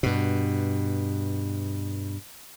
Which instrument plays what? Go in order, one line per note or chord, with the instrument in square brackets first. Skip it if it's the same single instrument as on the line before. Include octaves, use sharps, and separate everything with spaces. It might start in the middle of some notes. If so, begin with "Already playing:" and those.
[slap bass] G2 B2